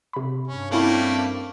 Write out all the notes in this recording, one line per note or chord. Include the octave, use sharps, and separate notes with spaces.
C3 B5
G2 C#4
G3 A3 A#3 C4 C#4 E4